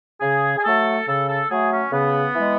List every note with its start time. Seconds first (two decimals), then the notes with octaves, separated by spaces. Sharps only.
0.21 C#3 G#4
0.57 G#4
0.64 F#3 A3 A4
1.07 C#3 A4
1.28 A4
1.49 F#3 A3 G#4
1.70 C#4
1.92 C#3 B3
2.35 E3 G#3